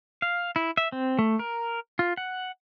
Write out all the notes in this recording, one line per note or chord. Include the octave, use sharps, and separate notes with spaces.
F5
E4
E5
C4
A3
A#4
F4
F#5